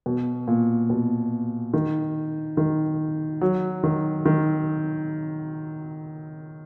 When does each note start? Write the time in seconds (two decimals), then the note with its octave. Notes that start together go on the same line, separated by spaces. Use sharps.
0.06 B2
0.48 A#2
0.90 B2
1.74 D#3
2.57 D#3
3.41 F#3
3.83 D#3
4.26 D#3